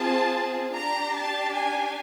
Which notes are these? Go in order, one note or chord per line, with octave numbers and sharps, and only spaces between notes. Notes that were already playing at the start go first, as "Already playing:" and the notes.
Already playing: C4 F4 G#4 A5
D4 G4 A#5
A5
G#5